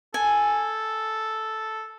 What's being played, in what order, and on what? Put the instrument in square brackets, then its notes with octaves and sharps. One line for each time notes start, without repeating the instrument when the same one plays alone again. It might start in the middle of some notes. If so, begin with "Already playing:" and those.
[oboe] A4 [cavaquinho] G#5